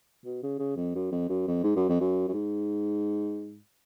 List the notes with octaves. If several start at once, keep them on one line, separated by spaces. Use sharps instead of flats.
B2
C#3
C#3
F2
F#2
F2
F#2
F2
G#2
F#2
F2
F#2
F#2
G#2